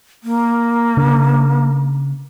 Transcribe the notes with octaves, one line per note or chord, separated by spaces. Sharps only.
A#3
C#3 D4